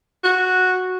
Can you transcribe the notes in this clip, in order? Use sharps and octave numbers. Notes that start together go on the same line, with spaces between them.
F#4